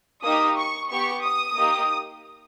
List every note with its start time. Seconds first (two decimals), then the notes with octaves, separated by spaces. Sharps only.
0.24 A#3 D#4 G4 D#6
0.57 C#6
0.90 B3 G4 C#6
1.23 D#6
1.57 A#3 D#4 G4